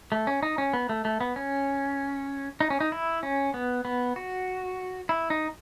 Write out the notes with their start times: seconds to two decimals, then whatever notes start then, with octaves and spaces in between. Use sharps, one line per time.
0.12 A3
0.27 C#4
0.43 D#4
0.58 C#4
0.73 B3
0.89 A3
1.05 A3
1.21 B3
1.36 C#4
2.60 D#4
2.70 C#4
2.80 D#4
2.92 E4
3.23 C#4
3.54 B3
3.85 B3
4.16 F#4
5.09 E4
5.30 D#4